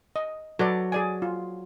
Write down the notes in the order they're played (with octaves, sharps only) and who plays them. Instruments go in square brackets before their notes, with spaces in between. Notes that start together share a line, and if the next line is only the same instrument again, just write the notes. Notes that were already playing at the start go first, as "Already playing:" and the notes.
[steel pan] D#5
[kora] F#3 [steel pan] A4 B4 D5
[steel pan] G#4 D5 G#5
F4